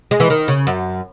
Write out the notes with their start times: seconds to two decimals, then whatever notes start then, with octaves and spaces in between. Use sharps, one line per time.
0.11 G#3
0.20 E3
0.30 D#3
0.48 C#3
0.67 F#2